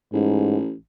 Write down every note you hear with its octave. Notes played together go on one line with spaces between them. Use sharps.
A1 G#2